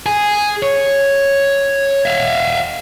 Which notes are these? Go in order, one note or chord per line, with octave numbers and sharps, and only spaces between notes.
G#4
C#5
E5 F5